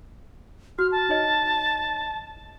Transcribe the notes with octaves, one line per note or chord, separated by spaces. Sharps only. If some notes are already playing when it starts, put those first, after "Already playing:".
F#4 F6
A5
D#4 C#5 D#5